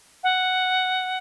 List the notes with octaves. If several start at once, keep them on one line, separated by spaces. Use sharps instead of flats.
F#5